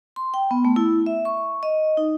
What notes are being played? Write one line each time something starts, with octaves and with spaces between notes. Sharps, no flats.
C6
G5
B3
A3
E4
E5
C#6
D#5
D#4